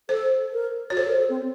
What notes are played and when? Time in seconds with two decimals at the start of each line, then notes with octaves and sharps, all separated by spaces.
0.09 A4 C5
0.53 A#4
0.90 F#4 C#5
0.97 A4 C5
1.08 A#4
1.19 A4
1.30 C4